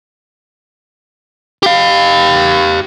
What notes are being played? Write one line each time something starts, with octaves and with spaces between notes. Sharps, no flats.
G4 F5